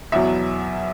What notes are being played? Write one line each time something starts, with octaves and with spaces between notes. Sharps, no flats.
E2 B2 F#3 E5